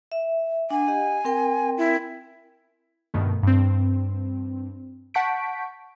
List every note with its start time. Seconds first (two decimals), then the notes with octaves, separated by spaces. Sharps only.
0.12 E5
0.70 D4 F#5 G#5
0.88 G4 D#5 F#5
1.25 C4 A#4 G5
1.78 E4
3.14 G2 B2 D#3 A3
3.43 G2 C4
5.14 F#5 A5 C#6 G6 B6 D7